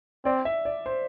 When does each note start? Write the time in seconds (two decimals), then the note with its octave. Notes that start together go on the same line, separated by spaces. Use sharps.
0.25 C4 D5
0.45 E5
0.65 D5
0.86 C5